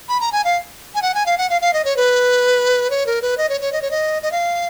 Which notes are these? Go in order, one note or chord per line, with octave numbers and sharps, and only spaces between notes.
B5
A#5
G#5
F5
G#5
F#5
G#5
F5
F#5
F5
F5
D#5
C#5
B4
C#5
A#4
B4
D#5
C#5
C#5
D#5
C#5
D#5
D#5
F5